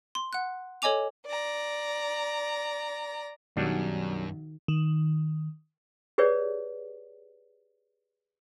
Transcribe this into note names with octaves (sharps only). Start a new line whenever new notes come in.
C6
F#5 F#6
A4 C#5 D#5 G#5 D6 F7
D5 A#5
B1 F#2 D#3 F#3 G3 D4
D#3
G4 G#4 B4 C#5 D5